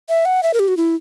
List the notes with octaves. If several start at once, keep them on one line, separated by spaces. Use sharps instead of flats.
E5
F#5
E5
A#4
G4
F#4
E4